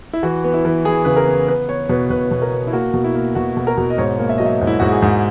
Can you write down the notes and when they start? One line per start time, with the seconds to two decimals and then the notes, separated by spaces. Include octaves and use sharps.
0.13 E4
0.23 E3 F#4
0.44 B3
0.54 E4
0.65 E3
0.85 E3 G#4
1.05 C#3 B4
1.16 A#4
1.27 B3
1.48 B3 B4
1.69 B3 C#5
1.89 B2 B4
2.10 B2 B4
2.31 B2
2.42 A#4
2.52 B3
2.67 E4
2.73 A#3 F#4
2.94 B2
3.04 E4
3.15 A#3
3.35 B2 F#4
3.57 B2
3.67 A#4
3.77 B2
3.90 D#5
3.98 G#2 C#5
4.19 A#3
4.29 E5
4.38 F#3 D#5
4.46 E5
4.61 G#2
4.67 E4
4.80 G#2 F#4
4.91 G#4
5.02 G#2